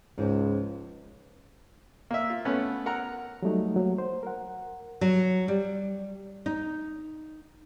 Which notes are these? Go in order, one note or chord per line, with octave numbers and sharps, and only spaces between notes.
C#2 G#2 F3
A#3 E5
F4
A3 B3 C#4
A#4 F#5 A#5
F#3 G3 A3 D#4
F#3 A#3
C5
A#4 F#5
F#3
G3
D#4